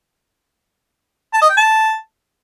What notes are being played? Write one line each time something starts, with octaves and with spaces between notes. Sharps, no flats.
A5
D#5
G5
A5